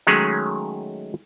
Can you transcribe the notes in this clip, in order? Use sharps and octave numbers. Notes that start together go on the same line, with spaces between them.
D#3 F#3 G#3 A3 C#4 G#4